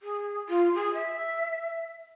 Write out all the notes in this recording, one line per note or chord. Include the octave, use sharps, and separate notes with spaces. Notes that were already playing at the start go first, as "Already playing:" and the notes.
G#4
F4
G#4
E5